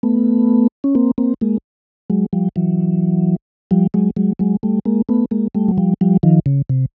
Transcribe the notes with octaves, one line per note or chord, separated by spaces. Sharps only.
A3 B3
C#4
A#3 C4
A#3 C4
G#3 A#3
F#3 G#3
F3 G3
E3 F#3
F3 G3
F#3 G#3
F#3 G#3
F#3 G#3
G3 A3
G#3 A#3
A3 B3
G#3 A#3
G3 A3
F#3
F3 G3
F3 G3
D#3 F3
C#3
C3